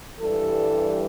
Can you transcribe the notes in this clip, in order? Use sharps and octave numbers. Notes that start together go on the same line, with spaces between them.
G2 E3 G3 A4